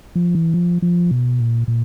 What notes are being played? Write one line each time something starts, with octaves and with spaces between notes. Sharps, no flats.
F3
E3
F3
F3
B2
A#2
A#2